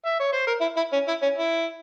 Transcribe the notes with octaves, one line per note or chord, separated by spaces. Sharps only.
E5
C#5
C5
A#4
E4
E4
C#4
E4
C#4
E4